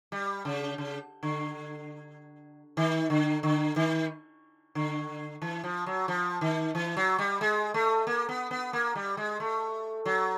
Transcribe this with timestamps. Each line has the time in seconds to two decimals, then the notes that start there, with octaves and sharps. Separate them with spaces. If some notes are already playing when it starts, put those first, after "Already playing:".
0.12 G3
0.45 C#3
0.78 C#3
1.23 D3
2.77 D#3
3.10 D3
3.43 D3
3.76 D#3
4.75 D3
5.42 E3
5.64 F3
5.86 F#3
6.08 F3
6.41 D#3
6.75 E3
6.96 F#3
7.19 G3
7.41 G#3
7.74 A3
8.07 A#3
8.29 B3
8.51 B3
8.73 A#3
8.95 G3
9.17 G#3
9.40 A3
10.06 F#3